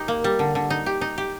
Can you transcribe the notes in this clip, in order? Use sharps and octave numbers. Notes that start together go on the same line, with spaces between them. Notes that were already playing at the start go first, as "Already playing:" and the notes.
Already playing: D#4 G4
A#3
G3
D3
D3
D#4
G4
D#4
G4